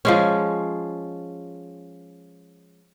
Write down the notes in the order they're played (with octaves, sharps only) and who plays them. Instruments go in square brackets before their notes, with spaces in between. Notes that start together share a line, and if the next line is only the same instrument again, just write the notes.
[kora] F3 G#3 C#4